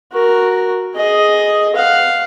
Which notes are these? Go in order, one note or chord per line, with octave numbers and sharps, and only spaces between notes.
F#4 A#4
G#4 D#5
F5 F#5